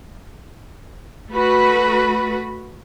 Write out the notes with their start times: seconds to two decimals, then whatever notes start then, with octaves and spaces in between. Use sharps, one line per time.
1.31 A3 F#4 B4 B5